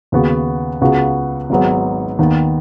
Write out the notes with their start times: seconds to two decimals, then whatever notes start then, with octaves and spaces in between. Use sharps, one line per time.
0.12 D#2 C#3 B3 F#4
0.81 C#2 C#3 B3 F#4
1.50 G#1 G#2 F#3 B3
2.19 D#2 D#3 B3